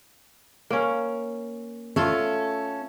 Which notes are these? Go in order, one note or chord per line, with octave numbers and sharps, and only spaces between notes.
A#3 C#4
A3 C#4 F4 A4